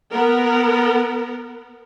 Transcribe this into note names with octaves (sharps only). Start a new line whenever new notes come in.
B3 A#4